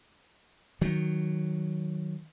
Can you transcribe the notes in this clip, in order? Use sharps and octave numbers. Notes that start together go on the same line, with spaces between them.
D#3 F#3